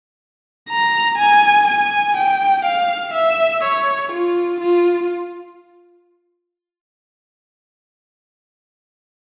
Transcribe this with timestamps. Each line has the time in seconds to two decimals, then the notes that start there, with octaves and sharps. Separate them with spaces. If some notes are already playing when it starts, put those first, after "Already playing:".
0.70 A#5
1.18 G#5
1.67 G#5
2.17 G5
2.65 F5
3.14 E5
3.64 C#5
4.12 F4
4.60 F4